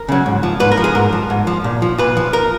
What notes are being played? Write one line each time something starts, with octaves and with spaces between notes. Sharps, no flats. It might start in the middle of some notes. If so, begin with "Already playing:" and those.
Already playing: A#4
C#3 F#3
G#2
F3
G#2 B4
A#4
F3
G#4
G#2 A#4
F3
G#2
F3
A#2
F3
A#2 B4
F3
A#4